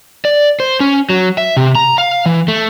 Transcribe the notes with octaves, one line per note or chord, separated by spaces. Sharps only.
D5
C5
C#4
F#3
E5
C3
A#5
F5
E3
A3